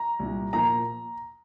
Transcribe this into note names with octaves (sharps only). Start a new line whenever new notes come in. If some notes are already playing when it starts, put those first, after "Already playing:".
Already playing: A#5
C2 A#2 G3
A#2 F3 A#3 A#5